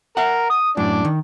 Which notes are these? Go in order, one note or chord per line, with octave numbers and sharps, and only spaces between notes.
A#4 E5 F#5
D#6
F#2 A2 D4 D5
D#3